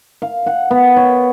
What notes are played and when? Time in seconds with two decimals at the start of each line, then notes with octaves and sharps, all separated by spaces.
0.22 F5
0.46 F#5
0.71 B3
0.97 C#5